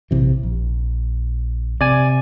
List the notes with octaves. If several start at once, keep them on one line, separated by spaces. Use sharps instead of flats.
A#1 C3 E3
A#1
C3 D5 G#5